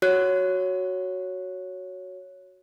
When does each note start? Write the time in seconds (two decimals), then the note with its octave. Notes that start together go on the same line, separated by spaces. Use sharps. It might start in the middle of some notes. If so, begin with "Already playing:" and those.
0.02 F#4 C#5 F#6